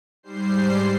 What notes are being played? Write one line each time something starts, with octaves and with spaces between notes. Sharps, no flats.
G#2 G3 C5 C7